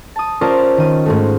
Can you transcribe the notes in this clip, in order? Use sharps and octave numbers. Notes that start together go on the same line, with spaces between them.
A5 D#6
C#4 F4 A#4 C5 D5 A5
D#3 D#7
G#2 G#3 A3